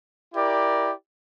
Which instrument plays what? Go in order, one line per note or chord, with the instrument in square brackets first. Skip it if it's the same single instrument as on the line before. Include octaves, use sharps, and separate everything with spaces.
[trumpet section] E4 G4 A#4 D5